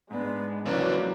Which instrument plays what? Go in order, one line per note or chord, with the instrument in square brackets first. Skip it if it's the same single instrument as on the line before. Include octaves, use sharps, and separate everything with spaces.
[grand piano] G#2 D4 [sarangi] G#3 [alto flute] B3
[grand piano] A#1 A#3 D5 [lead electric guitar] C#3 E3 [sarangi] F#3 [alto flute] B4